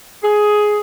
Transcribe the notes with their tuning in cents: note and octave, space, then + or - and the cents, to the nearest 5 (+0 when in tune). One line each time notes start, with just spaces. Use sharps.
G#4 +10